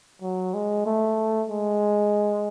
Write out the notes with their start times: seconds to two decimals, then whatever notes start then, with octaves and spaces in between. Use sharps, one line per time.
0.22 F#3
0.54 G#3
0.86 A3
1.50 G#3